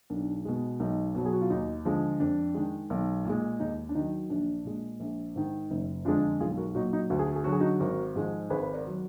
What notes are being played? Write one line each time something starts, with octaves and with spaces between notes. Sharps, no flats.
B1 D4
B2 G#3
B1 D#4
B2 F#3
G#4
F#4
F4
D#2 D#4
D3 F3 G#3
F2 D4
D#3 G#3
B1
A#2 G#3
D#2 D#4
D4
D#3 F#3 D#4
A#1 D4
A#2 G#3
A#1
G#2 D#3
F#1 D#4
F2 D3 G#3 D4 F4
B1 F4 G#4
F#4 A#4
A#2 F#3 D#4 F#4
D#4
D2 F#4
G#4
F#4
G#4
D3 F#3 F#4
G#4
D#4 F#4
G#1 F#4 A#4
G#2 F3 G#3
G#1 G#4 B4
B4
A#4 D5
F#3